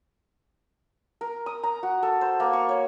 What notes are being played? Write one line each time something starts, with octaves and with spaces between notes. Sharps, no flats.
A#4
D#6
A#5
F#4
A4
C5
A#3
C#6
C#5